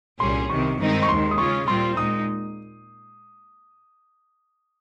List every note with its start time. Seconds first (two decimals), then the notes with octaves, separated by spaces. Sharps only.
0.20 C2 A#2 G3 C#4 G#4 C6
0.49 C2 C3 D#3 C#6
0.80 G2 D#3 G#3 C4 D#4
1.03 C#6
1.08 D#2 D#3 G#3 C6
1.31 D#6
1.38 C#3 G#3 C#4 F4 C#6
1.67 A#2 G3 C4 F4 C6
1.97 A#2 G#3 D#4 D#6